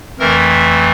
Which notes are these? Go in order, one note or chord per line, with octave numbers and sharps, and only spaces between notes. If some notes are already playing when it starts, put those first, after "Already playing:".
F2 E3 A3 A#4